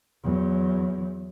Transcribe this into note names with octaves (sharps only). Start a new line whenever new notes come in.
E2 F#3